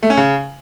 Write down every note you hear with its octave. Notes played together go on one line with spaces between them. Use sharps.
A3
C#4
C#3